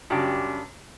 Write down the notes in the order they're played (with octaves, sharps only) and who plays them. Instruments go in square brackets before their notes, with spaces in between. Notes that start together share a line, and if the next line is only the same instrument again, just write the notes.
[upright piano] F#2 [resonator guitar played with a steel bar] C#3 G3 D4 G4